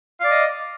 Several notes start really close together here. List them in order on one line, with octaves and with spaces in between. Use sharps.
F5 D5 D6 D#5